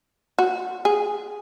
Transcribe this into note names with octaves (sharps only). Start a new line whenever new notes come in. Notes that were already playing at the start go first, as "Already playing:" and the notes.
F#4
G#4